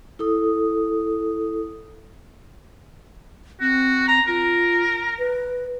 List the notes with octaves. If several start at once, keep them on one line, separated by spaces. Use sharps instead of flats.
E4 A4 D#6
C4 F#4
A#5
F4 A#4
B4